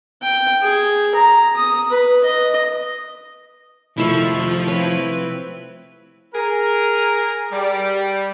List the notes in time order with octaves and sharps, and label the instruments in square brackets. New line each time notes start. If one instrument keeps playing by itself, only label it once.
[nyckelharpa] G5
G#4
A#5
D#6
B4
D#5
[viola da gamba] F2 D#3 [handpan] C3 A3 [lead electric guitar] F3 [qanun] E4 E5 C#6
[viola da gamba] C4 E4 B4 [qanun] C#5
[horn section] G#4 A#4
G3